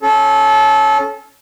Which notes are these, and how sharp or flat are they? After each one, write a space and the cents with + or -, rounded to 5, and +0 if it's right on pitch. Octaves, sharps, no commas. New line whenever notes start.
C#4 -5 A4 -25